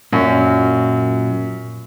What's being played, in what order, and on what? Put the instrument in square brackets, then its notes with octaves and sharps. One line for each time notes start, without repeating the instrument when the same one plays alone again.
[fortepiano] F#2 [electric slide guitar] A#2 F#3